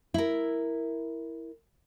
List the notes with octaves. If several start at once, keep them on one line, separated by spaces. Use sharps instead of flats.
E4 A#4